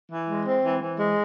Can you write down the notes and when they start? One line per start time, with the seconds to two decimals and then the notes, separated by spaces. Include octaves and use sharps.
0.09 E3
0.27 G#3
0.45 C4
0.63 E3
0.80 E3
0.98 G#3